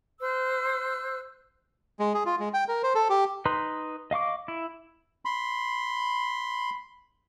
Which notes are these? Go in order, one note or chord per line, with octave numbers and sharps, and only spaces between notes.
C5 E6 F#6
G#3
G#4
F4
G#3
G5
A#4
C5
A4
G4
D#4 B4 C6
D#5 F5 C#6 D6
E4
B5 C6